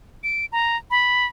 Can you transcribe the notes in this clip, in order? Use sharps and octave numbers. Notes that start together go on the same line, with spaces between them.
D7
A#5
B5